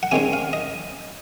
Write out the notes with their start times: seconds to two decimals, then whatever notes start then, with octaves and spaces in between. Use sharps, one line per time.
0.03 F#5
0.11 C3 D#3 G#3 C#4 G#5
0.33 F5
0.53 D#5